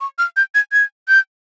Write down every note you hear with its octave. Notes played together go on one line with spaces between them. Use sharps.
C#6
F6
G6
G#6
G#6
G6